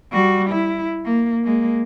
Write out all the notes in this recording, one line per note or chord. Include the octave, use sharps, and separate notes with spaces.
G3 F#4
E4
A#3
G#3 A#3